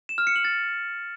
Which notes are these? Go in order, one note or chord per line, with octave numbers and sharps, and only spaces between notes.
E7
F6
C#7
F#7
A6